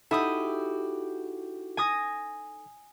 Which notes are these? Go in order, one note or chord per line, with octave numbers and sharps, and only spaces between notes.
D#4 E4 F#4 G4 A4 D#6
G#5 D#6 A#6